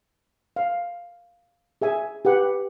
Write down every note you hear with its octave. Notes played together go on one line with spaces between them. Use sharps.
F5
G#4 E5 G#5
G4 B4 F#5